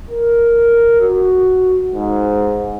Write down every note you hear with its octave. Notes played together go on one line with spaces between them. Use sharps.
A#4
F#4
G#2